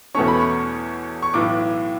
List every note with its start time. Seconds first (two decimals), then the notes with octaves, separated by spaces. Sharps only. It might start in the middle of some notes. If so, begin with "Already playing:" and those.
0.15 E2 B2 A3 C#4 C#6
0.28 B5
0.40 C#6
1.22 C#6
1.34 B1 A2 E3 D6